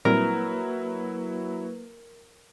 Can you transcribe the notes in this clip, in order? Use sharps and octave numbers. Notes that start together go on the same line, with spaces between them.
A#2 F#3 G3 A#3 C4 E4 A#4 B4